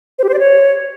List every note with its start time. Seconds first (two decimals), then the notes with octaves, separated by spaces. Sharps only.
0.19 C5
0.24 G4
0.29 C5
0.34 D5
0.39 C#5